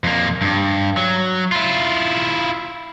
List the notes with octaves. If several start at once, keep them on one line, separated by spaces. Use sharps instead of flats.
F2 A#3
G2
F#3
E4 F4